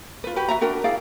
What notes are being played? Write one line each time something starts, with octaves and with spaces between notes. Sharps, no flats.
F4 B4
F#4 G4 B4 B5
F#4 E5 A#5
D4 F#4 A#4 G5
E4 G#4 D5 F5